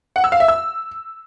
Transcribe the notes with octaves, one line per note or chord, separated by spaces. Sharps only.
F#5
E6
F5
E5
E6